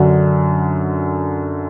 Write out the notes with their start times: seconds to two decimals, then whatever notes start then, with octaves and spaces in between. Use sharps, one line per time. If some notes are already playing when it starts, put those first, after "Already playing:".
Already playing: F#2 D3 F#5